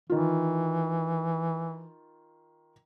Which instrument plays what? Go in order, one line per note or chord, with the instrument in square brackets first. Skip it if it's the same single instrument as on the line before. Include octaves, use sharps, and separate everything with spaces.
[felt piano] D#3 F4 [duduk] E3